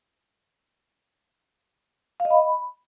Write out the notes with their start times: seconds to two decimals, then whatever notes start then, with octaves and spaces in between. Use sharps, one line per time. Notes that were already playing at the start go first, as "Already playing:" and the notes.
2.20 F5
2.25 D#5
2.31 B5